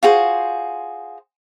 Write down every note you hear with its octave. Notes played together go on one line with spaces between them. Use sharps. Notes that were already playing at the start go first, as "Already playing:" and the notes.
F4 F#4 G#4 C5